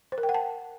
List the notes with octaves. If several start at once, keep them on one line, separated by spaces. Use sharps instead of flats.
C5
A#4
G5
F#5
A5